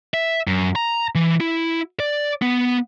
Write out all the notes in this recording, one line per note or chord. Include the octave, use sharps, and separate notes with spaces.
E5
F#2
A#5
E3
E4
D5
B3